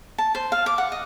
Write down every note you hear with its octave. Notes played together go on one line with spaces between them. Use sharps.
A5
C5
F5
D6
F#5
D#5